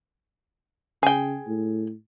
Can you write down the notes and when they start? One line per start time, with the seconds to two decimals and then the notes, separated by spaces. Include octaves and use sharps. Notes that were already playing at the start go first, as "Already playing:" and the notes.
1.03 C#3 G#4 G5
1.47 A2